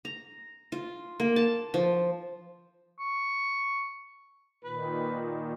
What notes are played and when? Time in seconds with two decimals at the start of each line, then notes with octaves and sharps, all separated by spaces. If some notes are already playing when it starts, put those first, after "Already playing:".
0.05 A#5
0.72 F4
1.20 A#3
1.36 A5
1.74 F3
2.99 C#6
4.64 A#2 D#3 B4